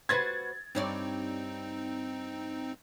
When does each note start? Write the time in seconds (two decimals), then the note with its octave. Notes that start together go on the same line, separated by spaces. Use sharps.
0.09 F#4 B4 C5 G#6 A6
0.75 G2 C4 D#4 C#5 D5